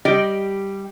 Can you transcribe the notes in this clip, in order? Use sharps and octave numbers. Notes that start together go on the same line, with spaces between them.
G3 G4 D5 D#5 G5